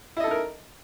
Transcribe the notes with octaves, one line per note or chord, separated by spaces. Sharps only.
D#4 E4 A4 A#4 D#5